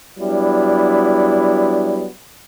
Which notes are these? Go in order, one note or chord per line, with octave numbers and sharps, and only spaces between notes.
F#3 G3 B3 D4 E4